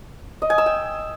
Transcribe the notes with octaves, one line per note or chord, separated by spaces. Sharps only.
D#5
G#5
E6
G5